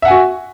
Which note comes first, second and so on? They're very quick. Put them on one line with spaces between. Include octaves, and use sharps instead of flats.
E5 F#5 G#5 F#4